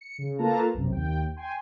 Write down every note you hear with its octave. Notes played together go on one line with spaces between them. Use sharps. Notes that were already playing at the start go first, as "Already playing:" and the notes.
C#7
C#3
A#3 F4 A4 B4 A5 A#5
B1 F#2 C3
D#2 G5
G5 G#5 C6